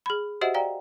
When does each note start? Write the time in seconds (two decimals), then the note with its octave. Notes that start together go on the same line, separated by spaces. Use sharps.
0.06 G#4 B5
0.41 F#4 G4 C5 D#5 E5 F#5
0.54 D5 F5 G5 A#5